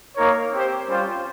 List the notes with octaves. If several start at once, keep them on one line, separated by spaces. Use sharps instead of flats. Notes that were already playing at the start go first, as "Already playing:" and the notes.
A#3 D#4 A#4 C#5
C4 G4 C5
G3 C#4 F4 C5 G5